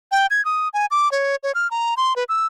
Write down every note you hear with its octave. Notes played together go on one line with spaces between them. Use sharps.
G5
G#6
D#6
G#5
D6
C#5
C#5
F6
A#5
C6
B4
E6